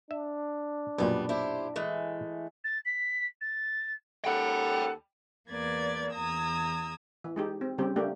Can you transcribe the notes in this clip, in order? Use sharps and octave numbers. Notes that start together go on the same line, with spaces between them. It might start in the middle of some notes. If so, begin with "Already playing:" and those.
D4 E5
B1 F#2 A#2 G3 B3
E4 G4 C5
E3 G#3 A3
A6
B6
A6
D#2 C#4 A4 F#5 G5 B5
E2 A#3 B4 D5 G#6 A6
E2 A#5 D#6 E6 G#6
E3
G#3 D#4 G4
C4
C#3 G3 C4 G4
A3 A#3 D4 G4